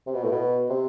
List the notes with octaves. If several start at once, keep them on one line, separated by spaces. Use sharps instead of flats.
C3
B2
A2
B2
C3